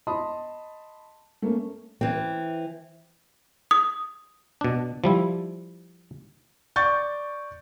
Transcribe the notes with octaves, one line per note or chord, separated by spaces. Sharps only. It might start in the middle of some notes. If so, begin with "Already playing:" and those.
D#5 A5 B5 C6 D#6
A3 A#3 C#4
E3 C4
D#6
B2 D4
F3 G3 E4
D5 C#6 G6 A6